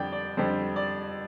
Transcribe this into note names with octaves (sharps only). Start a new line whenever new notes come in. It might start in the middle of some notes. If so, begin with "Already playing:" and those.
Already playing: F2 D3 G3 D5 G5
D5
F2 D3 G3 C5
D5